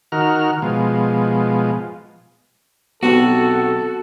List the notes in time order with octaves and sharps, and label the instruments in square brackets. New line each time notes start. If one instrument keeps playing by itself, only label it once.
[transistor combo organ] D#3 F#4 A#4 F6
B2 F3 G#3
[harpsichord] B1 C3 F#5 [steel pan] B3 [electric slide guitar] F#4 [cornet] A4